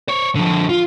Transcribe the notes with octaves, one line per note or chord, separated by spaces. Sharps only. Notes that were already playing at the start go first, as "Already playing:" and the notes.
C5 C#5
D3 F3
F4